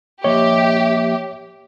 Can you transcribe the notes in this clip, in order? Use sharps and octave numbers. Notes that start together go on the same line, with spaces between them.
F3 A#3 G4 C#5 D#5 E5